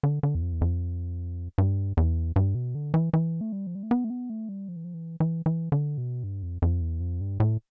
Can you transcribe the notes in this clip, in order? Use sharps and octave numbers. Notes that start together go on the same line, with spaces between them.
D3
D3
E2
F2
E2
F2
G2
E2
G2
B2
D3
E3
E3
A3
G3
F3
G3
A3
B3
A3
B3
A3
G3
F3
E3
F3
E3
E3
E3
D3
B2
G2
F2
F2
E2
F2
G2
A2